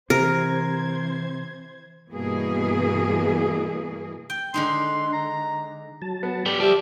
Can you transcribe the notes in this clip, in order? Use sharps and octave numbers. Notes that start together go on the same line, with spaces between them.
C3 E3 A#4 C5 G#6
G2 B2 E3 A#3 G#4
G5
D3 G#3 D#4 C6
A#5
F#3 A5
B3
G4 A4 D5 B5
F3 G3 G4 D5 E5